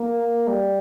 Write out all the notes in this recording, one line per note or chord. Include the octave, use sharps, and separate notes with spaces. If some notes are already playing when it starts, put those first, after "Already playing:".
Already playing: A#3
G3